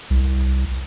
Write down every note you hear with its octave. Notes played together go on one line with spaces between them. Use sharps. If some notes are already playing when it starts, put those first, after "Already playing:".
C2